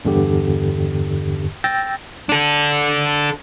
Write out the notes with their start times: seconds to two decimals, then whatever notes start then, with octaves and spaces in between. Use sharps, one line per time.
0.05 E2 G2 D3 G4
1.64 G5 E6 G6 A6 A#6
2.29 D4 A4